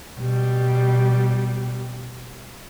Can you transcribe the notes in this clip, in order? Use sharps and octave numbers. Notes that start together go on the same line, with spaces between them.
B2 G3